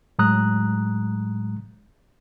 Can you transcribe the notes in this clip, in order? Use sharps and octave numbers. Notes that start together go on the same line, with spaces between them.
A2 F#3 G#3 A#5 D#6 F#6